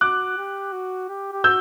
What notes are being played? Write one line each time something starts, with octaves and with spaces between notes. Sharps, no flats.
F#4 D6 F#6
G4
F#4
G4
G4
F#4 E6 G6